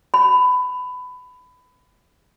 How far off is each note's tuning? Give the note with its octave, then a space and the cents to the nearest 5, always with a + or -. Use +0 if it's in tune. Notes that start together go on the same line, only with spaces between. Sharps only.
B5 +20